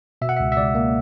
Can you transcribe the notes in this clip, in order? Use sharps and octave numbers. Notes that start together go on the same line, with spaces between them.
B2 E5
F#5
C#2 E5
E5
C#2 D5
A#3